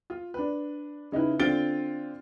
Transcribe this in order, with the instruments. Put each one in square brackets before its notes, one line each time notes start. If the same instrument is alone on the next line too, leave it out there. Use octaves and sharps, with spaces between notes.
[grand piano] F4
D4 B4
C#3 D#4 E4 B4
D3 C4 F4 A6 D7 G7